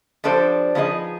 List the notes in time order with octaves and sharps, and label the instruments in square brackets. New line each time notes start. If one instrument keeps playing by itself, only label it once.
[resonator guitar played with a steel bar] F3 G3 D4 A4 C5
F3 B3 D#4 G#4 C#5 D#5